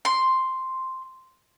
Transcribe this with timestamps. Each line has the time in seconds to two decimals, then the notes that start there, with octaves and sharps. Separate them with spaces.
0.05 C6